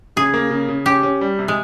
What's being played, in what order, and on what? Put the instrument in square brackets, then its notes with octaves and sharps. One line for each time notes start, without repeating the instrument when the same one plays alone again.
[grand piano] C#3 [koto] G#4
[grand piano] A#3
C#3
C#3
[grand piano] C#4 [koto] G4
[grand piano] C#4
G3
C3
[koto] G#3